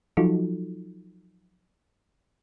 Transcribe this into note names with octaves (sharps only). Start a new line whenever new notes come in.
F3 F#3 D#4 F4 F#4 A4